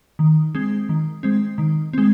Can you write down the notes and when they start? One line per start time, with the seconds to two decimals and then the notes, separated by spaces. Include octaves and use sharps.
0.19 D#3
0.55 G#3 C4
0.89 D#3
1.23 G#3 C4
1.58 D#3
1.93 G#3 C4